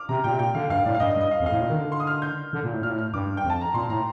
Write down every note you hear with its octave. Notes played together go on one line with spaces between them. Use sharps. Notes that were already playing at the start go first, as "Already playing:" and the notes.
Already playing: D6 F6
C3 A#5
A#2 G5
C3
A#2 G5
D3 F5
G2 F5
A2 D5
F5
G2 D#5
D#5
G2
D#5
F5
F2
F5
A2
A#2
D#3
D3
C6
D#6
F6
G6
D3
A#2
A2
A#2 F6
A2
F6
G2 D6
G5
F2
A5
A#5
A#2 C6
A2 A#5